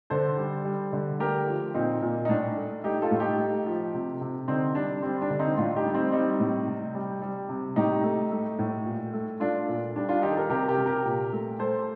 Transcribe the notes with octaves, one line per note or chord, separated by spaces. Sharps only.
D3 A4 C5
G3
G3
D3
A3 G4 A#4
F3
A#2 C4 D#4
A#2
D#4
A2 D4
A3
A3 D#4 G4
F4 A4
A2
D#4 G4
A3
F3
C3
C3
D3 C4 D#4
G3 D4
G3 C4
D4
D3
C4 D#4
A2 D4 F4
D#4 G4
G3
C4 D#4
G3 C4 D#4
A2
C3
G3
G3
C3
A2 D#4 G4
A3
A3
A2
A#2
A3
A3 D4 F4
A#2
G3 D4
D4 F4
D#3 D#4 G4
A4
G4 A#4
C3 G4 A#4
G4 A#4
C3
G4 A#4
A#2
A3
A3 A4 C5